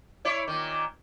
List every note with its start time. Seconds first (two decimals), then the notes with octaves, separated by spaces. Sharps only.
0.25 E4 C#5 D5
0.48 A#2 D#3